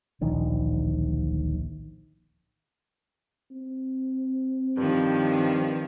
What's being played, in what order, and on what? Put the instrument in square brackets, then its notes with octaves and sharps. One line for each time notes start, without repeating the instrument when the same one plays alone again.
[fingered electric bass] D1 A#1 D#3
[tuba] C4
[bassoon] G2 [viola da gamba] D#3 F3